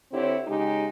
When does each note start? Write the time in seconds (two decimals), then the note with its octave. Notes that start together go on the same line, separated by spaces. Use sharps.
0.12 D3 C4 E4 G4 C#5
0.47 C#3 G#3 D#4 G4